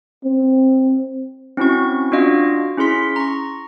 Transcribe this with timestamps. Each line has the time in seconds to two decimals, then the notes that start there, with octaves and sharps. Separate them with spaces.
0.25 C4
1.57 C4 C#4 E4 F#4 C#6
2.12 D4 F4 F#4 D#5 F5
2.77 C#4 E4 G#4 C6 B6
3.16 A#5 C#6